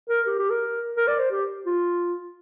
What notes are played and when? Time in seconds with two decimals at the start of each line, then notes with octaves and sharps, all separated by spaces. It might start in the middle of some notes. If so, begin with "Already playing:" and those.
0.09 A#4
0.27 G4
0.39 G4
0.50 A#4
0.96 A#4
1.08 D5
1.19 C5
1.31 G4
1.66 F4